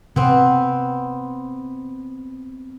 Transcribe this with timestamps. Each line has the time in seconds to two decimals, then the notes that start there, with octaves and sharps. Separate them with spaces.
0.16 C3 B3 C4